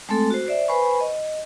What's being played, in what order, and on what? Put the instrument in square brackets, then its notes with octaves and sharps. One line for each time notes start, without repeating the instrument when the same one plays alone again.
[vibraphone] G#3 A3 C4 A4
F#4 C5
C5 D5 E5
B4 C5 G#5 B5 C#6
D#5